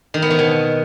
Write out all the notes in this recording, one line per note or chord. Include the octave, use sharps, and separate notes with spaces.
D#3
B3
D#3
B2